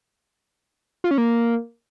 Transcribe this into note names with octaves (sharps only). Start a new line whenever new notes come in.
F4
C#4
A#3